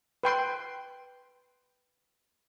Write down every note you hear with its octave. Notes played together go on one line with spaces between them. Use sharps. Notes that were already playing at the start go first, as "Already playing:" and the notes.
B4 G5 C6